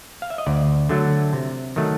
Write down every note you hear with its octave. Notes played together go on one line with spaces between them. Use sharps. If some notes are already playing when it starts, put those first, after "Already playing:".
F5
E5
D#5
D2 D5
D3 F#3 A3 D4
C3
D#3 F#3 A3